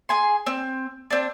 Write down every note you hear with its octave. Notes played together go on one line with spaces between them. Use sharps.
G#4 G#5 C6
C4
C4 D4